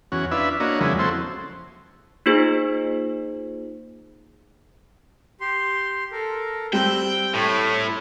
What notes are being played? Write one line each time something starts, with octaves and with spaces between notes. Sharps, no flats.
E2 C#4 F#4
D4 E4 F4 B4 E5
A#3 D4 F#4 C#5 D#5
E2 C#3 F3 F#3 G#3 E4
C4 F#4 A4 C5 E5
A#3 D#4 F4 G#4 C5
G4 C6
A4 A#4
G3 C4 G5 E6 F#6 G6
A2 C#5 A5 B5